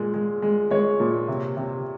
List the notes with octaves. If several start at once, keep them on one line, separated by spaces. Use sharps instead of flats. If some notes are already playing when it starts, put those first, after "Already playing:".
Already playing: A#2 G#3
G#3
G#3
G#3 C#5
A#2
C3
C3